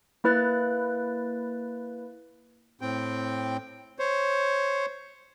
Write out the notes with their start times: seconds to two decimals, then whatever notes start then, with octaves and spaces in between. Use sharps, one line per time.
0.24 A#3 E4 B4 F#6 A6
2.81 A2 C4 G5
3.99 C5 C#5